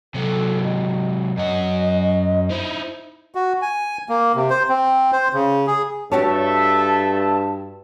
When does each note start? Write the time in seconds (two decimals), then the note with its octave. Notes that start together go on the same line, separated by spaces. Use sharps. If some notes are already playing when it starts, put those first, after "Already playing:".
0.14 C3 F#3 A4
0.62 D#5
1.37 F#2 F#4 D#5
2.50 D#4 E4 C5
3.35 F#4
3.62 G#5
4.09 A#3
4.35 C3
4.50 C5
4.69 C4
5.12 C5
5.33 C#3
5.67 G#4
6.12 G2 A3 F#4 G4 A4 C#5 E5 A5